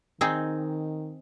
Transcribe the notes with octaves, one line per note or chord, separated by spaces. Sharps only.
D#3 C4 D#4 G#4